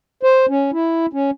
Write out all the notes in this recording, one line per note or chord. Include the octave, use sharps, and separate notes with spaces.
C5
C#4
E4
C#4